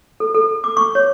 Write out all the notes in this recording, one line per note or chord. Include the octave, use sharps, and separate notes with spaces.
A4
A4
D6
C#6
C#5